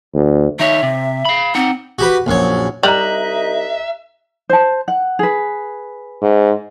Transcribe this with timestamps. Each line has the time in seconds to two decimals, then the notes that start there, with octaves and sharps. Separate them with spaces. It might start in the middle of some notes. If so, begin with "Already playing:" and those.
0.15 D2
0.59 D#3 D#4 C#5 E5
0.83 C3
1.25 F5 B5
1.55 C4 D#4 F#5
1.99 F#4 G4 B4
2.26 A#1 F#2 C#5
2.83 C2 G3 D#4 D#5 E5 A#5 F#6 F#7
4.49 C5 A5
4.88 F#5
5.19 G#4 B4
6.22 G#2